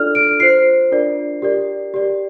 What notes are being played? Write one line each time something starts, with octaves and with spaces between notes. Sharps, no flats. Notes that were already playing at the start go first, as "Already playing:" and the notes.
Already playing: D4 F4 A4 D5 F6
D7
F4 C5 C7
D4 F4 A#4 D5
G4 A#4 D5
G4 D5